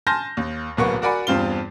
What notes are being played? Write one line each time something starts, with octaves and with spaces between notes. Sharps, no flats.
G#5 A5 C6 F6 G6 A#6
D#2
D1 B1 A#3 B4 F#5 C#6
F#4 A#4 D5 F#5 G#5 B5
E2 G2 C4 F4 G7